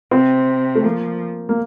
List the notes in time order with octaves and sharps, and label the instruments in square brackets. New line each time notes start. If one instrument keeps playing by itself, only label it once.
[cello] C3 [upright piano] C4
[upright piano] A3
[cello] F3 [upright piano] A#3
[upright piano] A#3